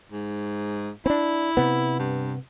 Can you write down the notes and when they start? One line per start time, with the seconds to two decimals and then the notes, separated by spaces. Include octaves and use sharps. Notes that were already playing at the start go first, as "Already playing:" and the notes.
0.12 G#2
1.06 C4 D4 E4
1.57 C3 B3
1.99 G2